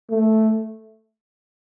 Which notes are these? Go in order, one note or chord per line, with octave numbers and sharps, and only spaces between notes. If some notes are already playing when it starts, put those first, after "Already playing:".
A3